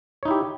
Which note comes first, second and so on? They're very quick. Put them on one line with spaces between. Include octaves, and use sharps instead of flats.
C#5 D#4 E4 G4